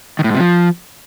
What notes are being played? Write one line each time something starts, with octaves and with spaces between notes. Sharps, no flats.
D#3
A2
G#2
C3
F3